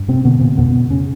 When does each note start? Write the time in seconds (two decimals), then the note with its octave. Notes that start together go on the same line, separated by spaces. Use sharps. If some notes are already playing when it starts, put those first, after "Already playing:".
Already playing: G2
0.08 C3 C4
0.24 B2 D3 B3
0.41 A#2 A#3
0.57 F2 B2 B3
0.90 C#3 C#4